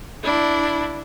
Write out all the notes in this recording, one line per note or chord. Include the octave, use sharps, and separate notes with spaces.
D4 E4